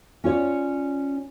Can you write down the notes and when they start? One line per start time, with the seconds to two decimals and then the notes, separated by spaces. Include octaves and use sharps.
0.24 C#4 F4 C#5 D5